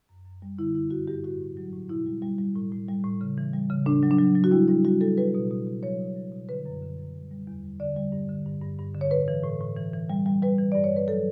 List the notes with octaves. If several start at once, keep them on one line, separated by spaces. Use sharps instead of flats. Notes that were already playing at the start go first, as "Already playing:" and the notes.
F#2
F#2
G3
D3 E4
G2 E4
G2 F#4
G2 G4
A2 F#4
A2
F#3
A2
B2 E4
G3
G3
G3
A2
A2
G3
A2
C#3
E3
G3
C#3
A2 D4
F#3
D4
F#3
F#3
F#4
G3 E4
G3 E4
G3 F#4
G3 A4
G3 B4
B2
B2
B2
F#3 C#5
B2
F#3
B2
D3 B4
F#2
D3
F#2
G3
G3
E2
G3
D3 D5
G3
G2
D3
G2
G2
G2
D3
C#5
A2 B4
E3
A2
A2
E3
E3
G3
G3
G3 B4
E3
G2 D5
C#5
G2
B4
F#3 A4